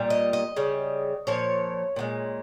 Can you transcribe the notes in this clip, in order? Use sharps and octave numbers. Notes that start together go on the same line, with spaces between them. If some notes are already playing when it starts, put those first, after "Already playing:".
Already playing: A#2 G3
D#5
D#5
C#3 G3
A#2 F3 C#5
A#2 F3 G#3